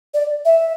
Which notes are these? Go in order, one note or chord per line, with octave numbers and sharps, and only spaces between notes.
D5
E5